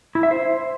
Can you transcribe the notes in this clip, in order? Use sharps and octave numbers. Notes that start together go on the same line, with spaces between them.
E4
E5
C5